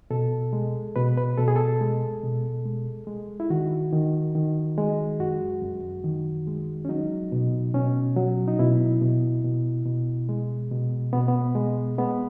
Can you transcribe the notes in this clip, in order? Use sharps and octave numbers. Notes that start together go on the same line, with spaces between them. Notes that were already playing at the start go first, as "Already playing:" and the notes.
B2 A4
G#3
B2 B4
B4
B2 A4
G#4
A4
G#3
B2
G#3
G#3
E4
D#3 F#4
D#3
D#3
G#3
F#2 F#4
F#2
D#3
G#3
C#4
F#3 D#4
B2
B2 C#4
F#3
D#4
B2 E4
B2
B2
B2
G#3
B2
B2 B3
B3
G#3
G#3 B3